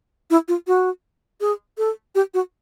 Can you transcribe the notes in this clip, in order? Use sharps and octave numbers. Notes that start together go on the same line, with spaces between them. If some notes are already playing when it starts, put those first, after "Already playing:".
E4
F4
F#4
G#4
A4
G4
F#4